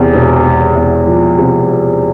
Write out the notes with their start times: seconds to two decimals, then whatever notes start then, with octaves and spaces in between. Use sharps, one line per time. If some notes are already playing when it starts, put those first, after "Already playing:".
Already playing: E2 C3
0.13 E1
0.45 E1
0.76 E2
1.07 F3
1.38 C3